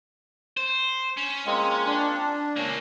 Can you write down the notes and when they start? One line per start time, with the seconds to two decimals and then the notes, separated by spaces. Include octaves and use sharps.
0.57 C5
1.17 C#4
1.46 G#3 A#3 C4 F4
1.87 D4
2.56 C#2 A#3 C#4